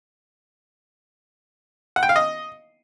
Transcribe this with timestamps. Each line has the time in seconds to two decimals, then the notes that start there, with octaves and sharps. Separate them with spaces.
1.96 F#5
2.03 G5
2.09 F5
2.16 D#5